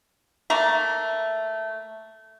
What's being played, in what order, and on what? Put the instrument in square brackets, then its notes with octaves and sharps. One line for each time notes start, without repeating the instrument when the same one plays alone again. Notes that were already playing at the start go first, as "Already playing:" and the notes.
[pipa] A3 A#3 A#5